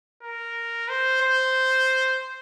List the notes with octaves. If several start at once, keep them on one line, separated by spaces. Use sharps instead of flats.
A#4
C5
C5